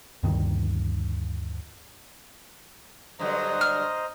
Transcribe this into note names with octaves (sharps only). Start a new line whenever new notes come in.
D2 G2 D#3
G2 D3 F#3 C5 D#5 A#5
F6